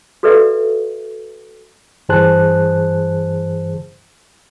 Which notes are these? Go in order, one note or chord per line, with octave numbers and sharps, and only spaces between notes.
F#4 A4 B4 D5 E5 F5
G2 E3 G#4 C5 A5 F#6